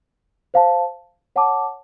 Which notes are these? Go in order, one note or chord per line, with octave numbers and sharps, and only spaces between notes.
C5 F5 A5
C#5 F#5 A5 D6